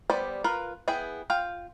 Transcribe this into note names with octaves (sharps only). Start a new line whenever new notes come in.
G3 B3 C5 D5
F4 A#4 B4
B3 E4 G#4 G5
F4 F5 G5